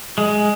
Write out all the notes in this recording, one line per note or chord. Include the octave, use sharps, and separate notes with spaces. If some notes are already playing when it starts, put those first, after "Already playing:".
G#3